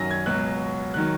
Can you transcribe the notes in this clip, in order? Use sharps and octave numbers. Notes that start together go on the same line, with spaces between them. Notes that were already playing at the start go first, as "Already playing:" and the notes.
Already playing: F#2 D#3 F#3 A#6
G#6
C#2 B2 F#3 F#6
D#3 F#3 F#6